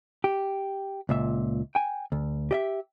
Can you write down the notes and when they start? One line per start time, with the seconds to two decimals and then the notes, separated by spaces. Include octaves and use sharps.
0.24 G4
1.09 C#2 A#2 E5
1.75 G5 G#5
2.12 D2
2.51 G4 D#5 E5